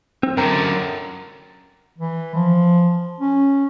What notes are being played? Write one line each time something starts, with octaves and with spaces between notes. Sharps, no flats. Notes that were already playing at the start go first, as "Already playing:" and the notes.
C4
F#2 D3 A#4 G5 A#5
E3
F3
C#4